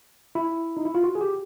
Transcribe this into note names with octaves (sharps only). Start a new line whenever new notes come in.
E4
D#4
E4
F4
F#4
G#4
G4